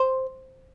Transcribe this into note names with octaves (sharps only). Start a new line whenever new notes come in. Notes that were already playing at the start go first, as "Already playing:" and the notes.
Already playing: C5